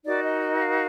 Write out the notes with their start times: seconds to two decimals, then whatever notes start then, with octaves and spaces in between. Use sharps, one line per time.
0.04 D#4 F#4 A#4 D5
0.23 D#5
0.41 D#5
0.59 F5